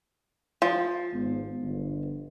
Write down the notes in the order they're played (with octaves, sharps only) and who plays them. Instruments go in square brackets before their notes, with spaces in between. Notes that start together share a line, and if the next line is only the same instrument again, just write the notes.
[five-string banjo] F3
[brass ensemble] G#1 G#2 B3
G1